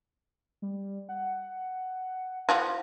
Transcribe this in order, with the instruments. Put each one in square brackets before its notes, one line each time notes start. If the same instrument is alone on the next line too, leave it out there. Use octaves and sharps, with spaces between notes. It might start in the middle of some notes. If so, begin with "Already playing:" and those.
[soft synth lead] G3
F#5
[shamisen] E3 F3 F#4